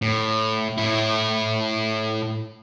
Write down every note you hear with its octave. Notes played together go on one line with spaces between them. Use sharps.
A2
A2 E4